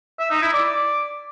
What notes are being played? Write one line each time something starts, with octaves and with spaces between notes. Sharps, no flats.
E5
D#4
E4
D5